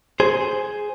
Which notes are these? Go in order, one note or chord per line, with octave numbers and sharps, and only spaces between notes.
G#4 C5